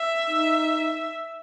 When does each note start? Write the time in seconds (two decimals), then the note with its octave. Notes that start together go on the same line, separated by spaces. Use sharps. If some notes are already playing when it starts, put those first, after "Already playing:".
Already playing: E5
0.27 D#4